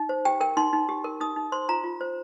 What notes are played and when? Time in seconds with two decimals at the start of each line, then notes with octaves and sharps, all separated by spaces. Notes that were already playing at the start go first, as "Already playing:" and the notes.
Already playing: D#4
0.09 C5
0.25 G4 G5
0.40 A#4 G5
0.57 D#4 C6
0.73 D#4
0.89 G4
1.04 A#4
1.20 D#4 D#6
1.36 D#4
1.52 C5 C6
1.69 F4 A#5
1.84 F4
2.01 C5